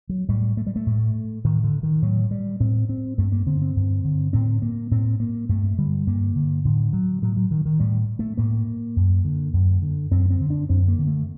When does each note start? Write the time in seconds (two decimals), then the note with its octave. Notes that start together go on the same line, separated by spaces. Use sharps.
0.09 F#3
0.29 A2 G3
0.57 A3
0.67 G3
0.76 A3
0.87 A2
1.44 A2 D#3
1.63 D3
1.83 D#3
2.02 A2 F#3
2.31 G3
2.60 A2 C4
2.89 C4
3.18 G2 A3
3.32 A#3
3.46 D3 C4
3.62 C4
3.76 G2
4.04 D3
4.33 A2 C4
4.62 A#3
4.91 A2 C4
5.20 A#3
5.49 G2 A3
5.78 D3 G3
6.07 G2 A#3
6.35 D3
6.65 A2 D3
6.93 F#3
7.22 A2 F#3
7.37 F#3
7.51 D#3
7.66 D#3
7.80 A2 G3
8.19 A3
8.37 A2 A#3
8.96 F#2
9.25 D3
9.53 F#2
9.82 D3
10.11 F#2 C4
10.30 C4
10.40 D3
10.50 D4
10.69 F#2 C4
10.88 A#3
10.98 D3
11.07 A3